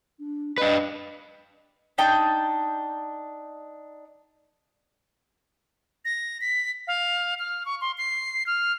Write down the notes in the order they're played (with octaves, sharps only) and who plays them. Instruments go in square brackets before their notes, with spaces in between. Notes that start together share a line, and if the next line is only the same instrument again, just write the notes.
[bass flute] D4
[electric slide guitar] D4 B4 [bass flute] D#5
[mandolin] D4 D#4 G5 A5
[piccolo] A#6
B6
F5
F6
C#6
C6
C7
F6